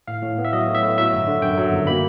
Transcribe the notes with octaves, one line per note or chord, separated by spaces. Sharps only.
A2 F5
A2
B3
E5
F#3 D#5
A2
E5
A2
F#3 E5
G1
D3
F#2 G5
F#3
G1
A#3 B5